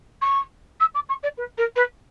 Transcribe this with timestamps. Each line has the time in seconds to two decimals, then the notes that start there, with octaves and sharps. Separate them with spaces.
0.22 C#6
0.80 E6
0.95 D6
1.09 C#6
1.23 D5
1.38 B4
1.58 A#4
1.76 B4